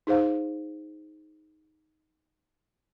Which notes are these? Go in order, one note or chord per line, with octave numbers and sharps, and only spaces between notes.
D#4 G#4 C5 F5